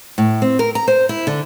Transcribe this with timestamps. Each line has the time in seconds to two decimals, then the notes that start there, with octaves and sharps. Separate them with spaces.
0.18 A2
0.42 C4
0.59 A#4
0.75 A#5
0.88 C5
1.09 E4
1.27 D3